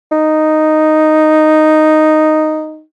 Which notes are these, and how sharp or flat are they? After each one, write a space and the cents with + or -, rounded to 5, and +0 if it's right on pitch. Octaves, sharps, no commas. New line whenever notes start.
D#4 -5